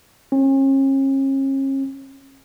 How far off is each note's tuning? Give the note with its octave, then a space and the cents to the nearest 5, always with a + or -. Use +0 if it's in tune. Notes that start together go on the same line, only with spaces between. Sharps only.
C#4 -40